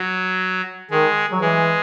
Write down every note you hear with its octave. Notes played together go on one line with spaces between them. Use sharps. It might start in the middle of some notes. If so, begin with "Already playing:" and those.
Already playing: F#3
D#3 G#3
F#3
E3 G#3